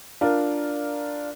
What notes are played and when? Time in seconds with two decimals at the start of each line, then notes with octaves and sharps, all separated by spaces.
0.21 D4 F4 A#4